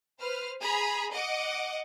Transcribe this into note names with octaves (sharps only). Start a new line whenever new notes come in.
B4 C5 F6
G#4 A#5 B5
D#5 F#5 D6